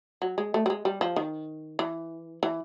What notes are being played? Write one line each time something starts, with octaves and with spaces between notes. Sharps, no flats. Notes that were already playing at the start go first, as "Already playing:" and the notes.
F#3
G#3
A3
G3
G#3
G3
F3
D#3
E3
E3